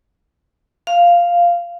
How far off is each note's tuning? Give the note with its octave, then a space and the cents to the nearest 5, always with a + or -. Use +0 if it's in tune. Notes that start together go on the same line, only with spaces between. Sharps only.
F5 -5